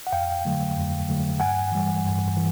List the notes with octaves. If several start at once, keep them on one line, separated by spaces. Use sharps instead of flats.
F#5
F2 F5 G5
D3 F#3 A3
F2
D3 F#3 A3
G2 F#5 G#5
E3 G3
G2
E3